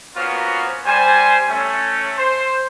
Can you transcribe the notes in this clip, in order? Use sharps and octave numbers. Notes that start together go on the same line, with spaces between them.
A#3 B3 C#4 F4 F#4 C5
G3 C5 G#5
A3 C#4
C5